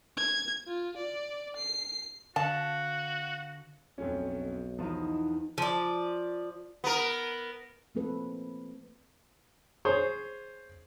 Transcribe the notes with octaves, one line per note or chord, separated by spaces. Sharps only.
G#6
F4
D5
C7
D3 F#4 F5 A5
B1 F2 A3 C#4
E2 F3 D#4
F3 D5
B3 A#4
F3 A3 A#3 C4 A4 B4
G#4 C5 C#5